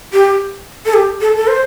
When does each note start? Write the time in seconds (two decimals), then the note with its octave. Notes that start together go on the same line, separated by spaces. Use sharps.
0.13 G4
0.86 A4
0.94 G4
1.21 A4
1.37 A4
1.47 C5